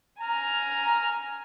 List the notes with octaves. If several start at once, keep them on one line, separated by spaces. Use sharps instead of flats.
G#5 A#5 F6